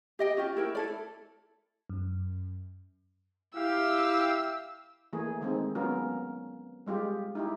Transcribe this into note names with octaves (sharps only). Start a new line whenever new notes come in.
G4 D#5 G5
C#4 F4 G4
E4 A#4 G5
E4 A4 D5
F#2
E4 G4 F5 E6
E3 A3 A#3 G#4
D#3 G#3 C4 D#4
F#3 B3 C#4 F4 A#4
G3 G#3 F4 G4
D#4 E4 G4